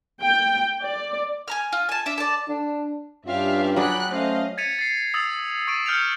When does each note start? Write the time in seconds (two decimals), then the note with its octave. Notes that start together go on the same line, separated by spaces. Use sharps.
0.23 G5
0.82 D5
1.48 G#5 A#5 F6
1.73 F4
1.89 G#5 A5
2.06 D4 E5
2.18 D5 A5
2.49 D4
3.27 G2 C#4 F4 G4 E5 F5
3.76 F#3 G#4 D5 G5 B5 F#6
4.11 A3 C#4 C5 D#5 F5
4.58 G#6 A6 B6 C#7 D#7 F7
4.79 A6 C7
5.14 D#6 E6 A6 C7 F7
5.67 C#6 A6 D7 D#7
5.86 E6 F6 G6 C#7 D7 F7